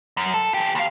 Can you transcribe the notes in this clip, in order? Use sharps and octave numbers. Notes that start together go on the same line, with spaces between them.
F#2
A4
E2 G4
D#2 F5